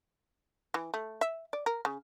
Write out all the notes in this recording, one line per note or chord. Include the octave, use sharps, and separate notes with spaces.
E3
A3
E5
D5
A#4
C#3